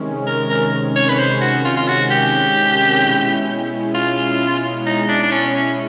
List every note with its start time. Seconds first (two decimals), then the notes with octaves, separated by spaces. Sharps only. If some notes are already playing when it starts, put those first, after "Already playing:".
Already playing: C3 D#3 G#3 C#4
0.27 A#4
0.50 A#4
0.96 C#5
1.09 B4
1.19 C5
1.42 F#4
1.65 F4
1.77 F4
1.88 F#4
2.11 G4
3.03 B2 G#3 C#4 E4
3.95 F4
4.86 D#4
5.09 D4
5.23 D4
5.31 C#4
5.55 C#4